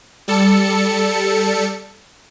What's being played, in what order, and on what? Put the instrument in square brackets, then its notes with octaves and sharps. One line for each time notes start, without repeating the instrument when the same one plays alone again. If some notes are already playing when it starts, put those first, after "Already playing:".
[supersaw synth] G3 A4 C#7